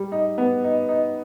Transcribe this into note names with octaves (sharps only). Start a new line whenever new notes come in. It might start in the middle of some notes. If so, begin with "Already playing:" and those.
Already playing: G3
D#4
B3
D#4
D#4